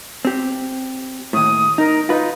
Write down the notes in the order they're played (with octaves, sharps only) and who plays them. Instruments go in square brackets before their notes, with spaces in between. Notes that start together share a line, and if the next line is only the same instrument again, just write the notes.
[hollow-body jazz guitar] C4 G4
[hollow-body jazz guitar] D#2 A2 [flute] D#6
[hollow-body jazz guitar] D#4 [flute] A#4
[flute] D#4 [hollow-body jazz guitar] F4 B4